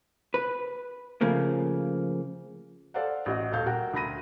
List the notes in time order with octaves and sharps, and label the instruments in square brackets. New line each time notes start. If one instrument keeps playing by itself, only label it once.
[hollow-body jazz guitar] B4
C#3 F3 A3 A#3
[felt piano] A4 C5 D5 F5 F#5
A1 F#4 D#5
D#1 A4 F5 G6
F#4 A#4 F#5 G5
D2 G5 A#5 B5 A#6 D#7